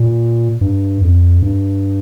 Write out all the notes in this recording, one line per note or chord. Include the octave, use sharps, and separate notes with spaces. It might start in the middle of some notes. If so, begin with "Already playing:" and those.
Already playing: A#2
G2
F2
G2